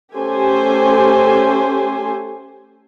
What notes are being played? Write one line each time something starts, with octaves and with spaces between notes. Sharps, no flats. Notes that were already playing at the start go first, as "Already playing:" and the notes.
A3 C#4 G4 A4 C5 G#5